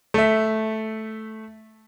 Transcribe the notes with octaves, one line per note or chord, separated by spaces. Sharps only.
A3 E5